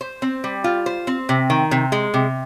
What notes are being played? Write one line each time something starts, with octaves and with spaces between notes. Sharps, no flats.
C5
C4
G3
F4
C5
C4
C3
D#3
C3
G#3
C3